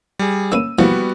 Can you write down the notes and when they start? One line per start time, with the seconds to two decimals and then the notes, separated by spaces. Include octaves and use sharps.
0.19 G3 G#4
0.52 A#3 C#4 B4 E6 D#7
0.79 E3 F3 G3 A#3 B3 F#4